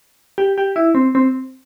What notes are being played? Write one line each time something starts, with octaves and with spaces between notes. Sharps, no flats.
G4
G4
E4
C4
C4